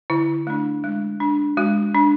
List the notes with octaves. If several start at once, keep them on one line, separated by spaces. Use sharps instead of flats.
D3 E4
A3 D4
G#3
D4
G#3 F#4
D4